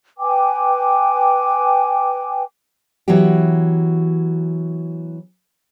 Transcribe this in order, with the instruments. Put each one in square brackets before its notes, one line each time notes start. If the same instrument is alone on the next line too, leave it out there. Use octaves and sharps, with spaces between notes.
[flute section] B4 G5 G#5 D6
[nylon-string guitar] E3 F#3 B3 F#4 G4